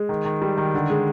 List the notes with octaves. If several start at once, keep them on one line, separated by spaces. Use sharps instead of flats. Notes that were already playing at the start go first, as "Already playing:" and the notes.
Already playing: G#3
D#3
D#3
G3
D#3
D3
G#3